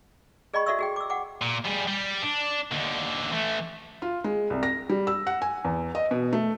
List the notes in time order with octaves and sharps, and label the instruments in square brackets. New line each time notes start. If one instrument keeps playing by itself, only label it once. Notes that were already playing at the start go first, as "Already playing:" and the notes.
[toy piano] G#4 D5 D#5 G5 B5 C#6
F#4 A4 D5 E5 C#6 E6
F#4 G#4 G5
D6 E6
F#5 G5 D6
[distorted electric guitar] A#2
G3 G#4
G3
D4
D#2 D3
E3 A3
[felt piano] F4
G#3
C2
A#6
G3
E6
F#5
G#5
E2
D#5
B2
A3